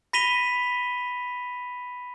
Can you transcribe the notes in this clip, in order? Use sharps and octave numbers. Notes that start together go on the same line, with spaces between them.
B5 A#6 B6 D#7 F7 G7